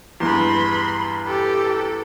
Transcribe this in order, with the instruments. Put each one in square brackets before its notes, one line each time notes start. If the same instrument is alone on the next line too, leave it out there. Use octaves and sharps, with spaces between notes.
[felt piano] E2 G2 [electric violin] B5 C6
[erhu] G4 [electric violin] A4